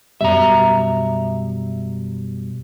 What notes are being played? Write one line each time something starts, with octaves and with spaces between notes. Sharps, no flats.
F#2 B2 G3 E5 A#5